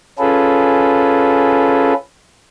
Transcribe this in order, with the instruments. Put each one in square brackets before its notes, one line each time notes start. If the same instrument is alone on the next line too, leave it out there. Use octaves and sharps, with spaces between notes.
[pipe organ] C#4 F4 G#4 A4 B4